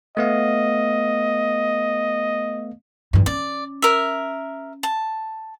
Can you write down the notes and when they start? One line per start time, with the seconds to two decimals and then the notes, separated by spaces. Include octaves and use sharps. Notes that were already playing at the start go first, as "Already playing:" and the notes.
0.17 A3 B3 D#5 F5
3.13 G2 E3
3.26 C#4 D5
3.82 A#4 E5
4.83 A5